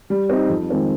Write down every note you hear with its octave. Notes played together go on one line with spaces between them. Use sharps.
G3
C4 D#4
F2
D#3 G#3 C4 F4